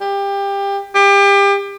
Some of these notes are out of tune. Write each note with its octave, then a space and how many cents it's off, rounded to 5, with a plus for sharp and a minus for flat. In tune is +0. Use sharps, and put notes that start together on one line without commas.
G4 +25
G4 +30